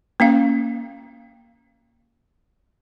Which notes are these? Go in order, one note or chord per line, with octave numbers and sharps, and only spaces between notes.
A#3 C#4 F5